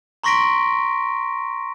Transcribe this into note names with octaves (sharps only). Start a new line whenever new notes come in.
A#5 C6 C#6 A#6 B6 D7